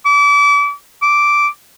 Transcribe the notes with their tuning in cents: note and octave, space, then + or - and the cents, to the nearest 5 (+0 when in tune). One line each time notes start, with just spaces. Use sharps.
D6 -35
D6 -5